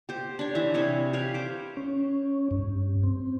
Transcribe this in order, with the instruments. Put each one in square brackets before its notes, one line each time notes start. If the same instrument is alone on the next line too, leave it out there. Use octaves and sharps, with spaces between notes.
[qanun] G4 C5
D4 C#5
E3 E5
C3 C#5 D#5
G4 B4 C#5 F5
C5 D6
[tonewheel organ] C#4
G2
C4